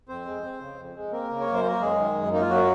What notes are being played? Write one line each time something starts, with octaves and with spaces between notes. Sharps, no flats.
F2 C4 C5
G#3
C4
C#3
F2
G#3
A#3 C4 A#4
C#3
C#5
F#2
C5
A#3 A#4
F#2 G#3 G#4
D#3
F#2
A#3 D#4
F4
F#2 F#3 F#4